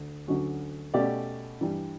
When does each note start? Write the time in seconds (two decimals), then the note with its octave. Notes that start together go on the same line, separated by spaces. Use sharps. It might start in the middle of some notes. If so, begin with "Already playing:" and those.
Already playing: D2
0.28 D2 D3 F#3 C#4 F#4
0.94 B2 A3 C#4 G4 D5
1.61 G2 E3 G3